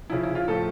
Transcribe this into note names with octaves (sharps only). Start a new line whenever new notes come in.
C#3 F3 E4
E4
F4
A2 F3 A4